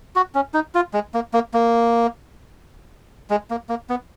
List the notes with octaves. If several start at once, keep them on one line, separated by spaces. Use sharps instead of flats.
F#4
C#4
D#4
F4
G#3
A#3
A#3
A#3
G#3
A#3
A#3
B3